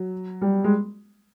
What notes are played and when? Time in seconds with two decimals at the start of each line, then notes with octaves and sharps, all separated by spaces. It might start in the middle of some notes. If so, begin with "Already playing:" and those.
Already playing: F#3
0.41 G3
0.64 G#3